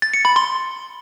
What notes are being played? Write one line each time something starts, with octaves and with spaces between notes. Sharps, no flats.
A6
C#7
B5
C6